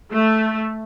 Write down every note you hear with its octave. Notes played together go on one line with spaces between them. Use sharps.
A3